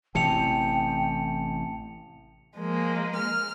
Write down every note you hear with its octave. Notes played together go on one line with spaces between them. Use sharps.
A1 C3 E3 G5 A5 C#7 F7
F3 G#3 A#3
F6